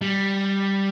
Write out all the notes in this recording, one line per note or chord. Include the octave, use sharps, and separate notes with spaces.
G3